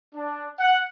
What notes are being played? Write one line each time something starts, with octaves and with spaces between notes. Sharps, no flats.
D4
F#5